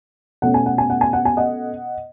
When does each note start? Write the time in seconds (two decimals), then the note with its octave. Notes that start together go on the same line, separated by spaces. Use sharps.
0.42 B2 A3 C#4 F#5
0.54 G#5
0.66 F#5
0.78 G#5
0.90 F#5
1.01 G#5
1.13 F#5
1.25 G#5
1.37 D#5 F#5